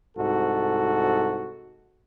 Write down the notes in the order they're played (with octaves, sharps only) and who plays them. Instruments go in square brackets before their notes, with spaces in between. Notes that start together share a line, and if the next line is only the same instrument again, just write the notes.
[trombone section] C2 G#2 F#4 A4